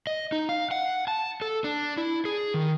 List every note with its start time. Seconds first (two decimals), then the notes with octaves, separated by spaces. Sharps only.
0.07 D#5
0.32 D#4
0.49 F5
0.71 F#5
1.08 A5
1.42 A4
1.64 D4
1.98 E4
2.25 G#4
2.54 D#3